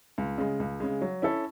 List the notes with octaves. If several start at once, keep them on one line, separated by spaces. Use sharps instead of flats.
C#2
C#3 G#3
C#2
C#3 G#3
F#3
C#4 E4 A4